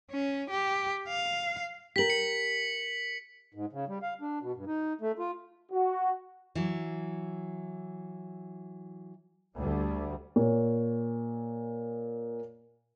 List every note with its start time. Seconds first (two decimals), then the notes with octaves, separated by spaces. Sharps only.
0.11 C#4
0.50 G4
1.08 F5
1.96 G4 A#4 B6 F#7
2.10 C#7
3.54 G#2
3.73 C#3
3.88 G3
4.02 F5
4.21 D4
4.42 B2
4.55 G2
4.67 D#4
5.01 A3
5.19 F4
5.71 F#4
6.55 E3 F#3
9.57 D2 G3
10.36 A#2 C#5